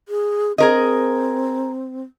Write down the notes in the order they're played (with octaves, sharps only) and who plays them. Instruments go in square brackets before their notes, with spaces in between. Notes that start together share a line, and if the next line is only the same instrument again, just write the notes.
[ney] G#4
[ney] C4 [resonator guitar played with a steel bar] G#4 A#4 D#5